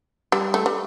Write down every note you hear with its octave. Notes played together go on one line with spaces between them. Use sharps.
G3
A3
G3